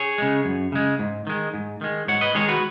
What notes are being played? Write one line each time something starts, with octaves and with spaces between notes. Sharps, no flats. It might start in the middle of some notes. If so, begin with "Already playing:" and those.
Already playing: G#4 C#5
C#3 G#3
F#2
C#3 G#3
G#2
D#3 G#3
G#2
D#3 G#3
G#2 C#5 F#5
B4 D#5
D#3 G#3 G#4 C#5
F#4 B4